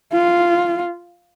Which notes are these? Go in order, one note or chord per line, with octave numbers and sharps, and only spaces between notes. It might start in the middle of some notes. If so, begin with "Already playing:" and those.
F4